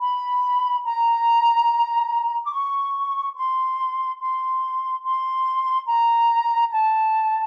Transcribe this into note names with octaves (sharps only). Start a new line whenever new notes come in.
B5
A#5
D6
C#6
C6
C6
C6
A#5
A5